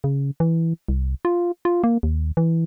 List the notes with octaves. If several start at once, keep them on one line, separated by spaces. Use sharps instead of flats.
C#3
E3
C2
F4
F4
A#3
D#2
E3